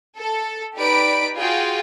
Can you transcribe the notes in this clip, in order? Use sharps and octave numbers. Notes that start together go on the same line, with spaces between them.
A4
D#4 G4 B4 D5 B5 D7
F4 F#4 G#4 G5